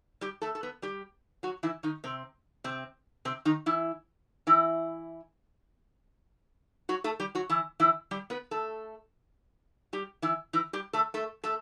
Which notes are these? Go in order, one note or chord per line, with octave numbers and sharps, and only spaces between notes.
G3 G4
A3 A4
A4
B3 B4
G3 G4
F#3 F#4
E3 E4
D#3 D#4
C3 C4
C3 C4
C3 C4
D#3 D#4
E3 E4
E3 E4
F#3 F#4
A3 A4
G3 G4
F#3 F#4
E3 E4
E3 E4
G3 G4
B3 B4
A3 A4
G3 G4
E3 E4
E3 E4
G3 G4
A3 A4
A3 A4
A3 A4